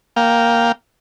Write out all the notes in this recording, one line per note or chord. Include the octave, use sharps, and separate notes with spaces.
A#3 F5 G5